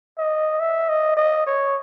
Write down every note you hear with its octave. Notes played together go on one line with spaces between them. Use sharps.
D#5
E5
D#5
D#5
C#5